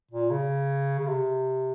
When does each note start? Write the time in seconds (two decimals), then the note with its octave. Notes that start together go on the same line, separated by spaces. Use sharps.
0.11 A#2
0.31 C#3
0.99 C#3
1.07 C3